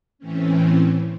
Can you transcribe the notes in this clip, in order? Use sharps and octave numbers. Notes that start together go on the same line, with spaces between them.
A2 E3 A3 C4 C#4